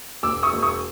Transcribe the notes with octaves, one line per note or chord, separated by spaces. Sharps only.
E1 D6 E6
C#6 D#6
E1
C#6 D#6